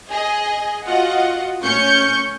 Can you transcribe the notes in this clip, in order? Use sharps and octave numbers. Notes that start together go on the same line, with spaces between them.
G#4 D#5
F4 F#4 D#5 F#5
A2 C#4 C#6 G6 C#7